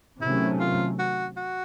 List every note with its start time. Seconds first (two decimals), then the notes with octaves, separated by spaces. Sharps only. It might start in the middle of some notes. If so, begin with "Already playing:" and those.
0.21 C3 D#3 F#3 A3 C#4 E4
0.60 F4
0.99 F#4
1.37 F#4